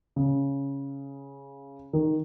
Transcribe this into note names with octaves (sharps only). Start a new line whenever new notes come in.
C#3
D#3